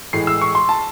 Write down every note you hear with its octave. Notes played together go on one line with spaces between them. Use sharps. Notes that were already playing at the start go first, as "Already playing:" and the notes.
A2 E3 G#3 C7
E6
C#6
C6
A5